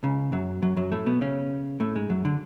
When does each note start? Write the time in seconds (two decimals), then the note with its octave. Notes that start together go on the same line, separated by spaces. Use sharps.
0.03 C#2 C#3
0.32 F#2 F#3
0.62 F#2 F#3
0.76 F#2 F#3
0.92 A2 A3
1.06 B2 B3
1.21 C#3 C#4
1.80 A2 A3
1.95 G#2 G#3
2.09 F#2 F#3
2.25 D3